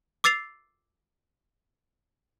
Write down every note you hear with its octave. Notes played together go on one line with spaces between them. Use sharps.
D6 E6 A6 C7 F7